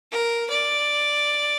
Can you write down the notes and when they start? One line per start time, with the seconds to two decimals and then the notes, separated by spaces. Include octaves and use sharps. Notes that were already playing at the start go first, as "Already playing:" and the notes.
0.11 A#4
0.50 D5